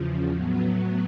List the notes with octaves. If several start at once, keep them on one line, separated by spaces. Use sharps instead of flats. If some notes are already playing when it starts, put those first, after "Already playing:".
Already playing: E2 C#3 F3
A2 F#3 B3